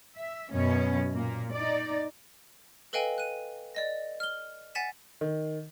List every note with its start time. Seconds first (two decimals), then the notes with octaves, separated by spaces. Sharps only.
0.16 E5
0.53 F#2 B2 B3 C#4
1.15 A#2 A#3
1.53 D#4 D5
2.93 A4 B4 D#5 F5 G5 G#5
3.18 F#6 D#7
3.75 D5 D#5 A#6
4.20 F6 G7
4.75 F#5 G#5 A6 B6 E7
5.21 D#3